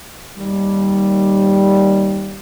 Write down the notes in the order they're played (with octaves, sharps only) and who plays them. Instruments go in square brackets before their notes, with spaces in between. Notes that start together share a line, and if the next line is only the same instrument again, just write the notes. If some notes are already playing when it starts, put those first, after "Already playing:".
[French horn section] D#2 G3